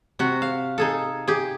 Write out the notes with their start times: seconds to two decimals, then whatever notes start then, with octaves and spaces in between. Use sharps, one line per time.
0.19 C3 F#4
0.42 F5
0.78 D#4 G#4 A4
1.28 G4 G#4